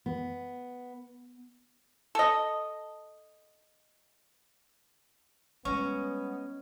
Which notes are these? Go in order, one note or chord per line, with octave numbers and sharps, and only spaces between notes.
B3
A4 D#5
G3 G#3 B3 C#4 D#5 C#6